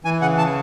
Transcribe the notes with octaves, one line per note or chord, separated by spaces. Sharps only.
E3 G#5
C#3 F#5
A5